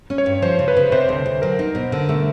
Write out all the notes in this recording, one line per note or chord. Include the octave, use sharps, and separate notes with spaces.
C#4
C#5
G2
F3 C5
C#3
B4
C#3
C3 C5
D2
D2
F#3 A#4
D#4
B2
D3
A3